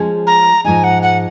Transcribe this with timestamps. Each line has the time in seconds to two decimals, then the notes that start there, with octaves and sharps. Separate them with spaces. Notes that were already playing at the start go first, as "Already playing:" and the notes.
Already playing: F3 G#3 C#4 G#4
0.27 A#5
0.64 G#2 F3 G#3 D#4 G#5
0.84 F#5
1.03 F#5